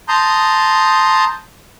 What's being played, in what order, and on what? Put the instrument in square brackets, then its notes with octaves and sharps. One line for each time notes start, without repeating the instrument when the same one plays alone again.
[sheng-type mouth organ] A5 A#5 C6 D#6 G6